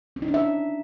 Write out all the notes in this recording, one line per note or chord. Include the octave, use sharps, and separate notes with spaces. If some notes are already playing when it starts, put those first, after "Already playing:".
C#4
D#4
D4
E5